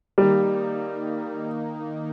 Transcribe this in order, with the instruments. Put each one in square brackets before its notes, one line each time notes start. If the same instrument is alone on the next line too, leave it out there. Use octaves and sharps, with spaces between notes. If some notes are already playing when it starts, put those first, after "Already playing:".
[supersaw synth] D#3 A#3 D#4 [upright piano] G3